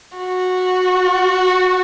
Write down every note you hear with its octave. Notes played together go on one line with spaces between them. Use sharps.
F#4